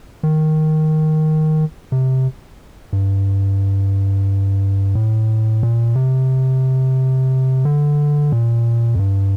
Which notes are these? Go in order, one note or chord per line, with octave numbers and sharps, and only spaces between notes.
D#3
C3
G2
A2
A#2
C3
D3
A#2
F2
G2